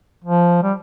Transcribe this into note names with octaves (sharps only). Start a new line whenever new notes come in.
F3
G3